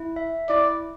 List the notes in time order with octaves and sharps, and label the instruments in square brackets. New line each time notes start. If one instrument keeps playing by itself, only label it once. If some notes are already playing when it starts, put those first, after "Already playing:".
Already playing: [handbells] E4
E5
[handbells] E4 [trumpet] D5